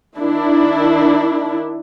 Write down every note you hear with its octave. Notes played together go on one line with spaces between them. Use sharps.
D#3 D4 E4